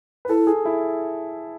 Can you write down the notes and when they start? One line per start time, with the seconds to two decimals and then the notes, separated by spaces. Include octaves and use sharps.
0.25 B4
0.29 E4 A4
0.47 G#4
0.65 E4